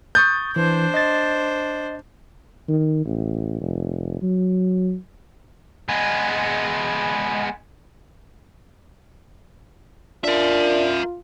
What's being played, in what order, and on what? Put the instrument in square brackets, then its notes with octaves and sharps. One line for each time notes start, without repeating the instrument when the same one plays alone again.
[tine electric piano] C#6 D#6 A6 [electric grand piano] G6
[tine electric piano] E3 [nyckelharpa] D4 C5
[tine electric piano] D#5 A6
[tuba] D#3
A1
F1
F#3
[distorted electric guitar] G#3 B3
[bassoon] D4 [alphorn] F4 [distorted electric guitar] A#4 E5